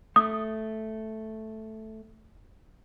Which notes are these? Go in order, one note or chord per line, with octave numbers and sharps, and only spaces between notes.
A3 D#6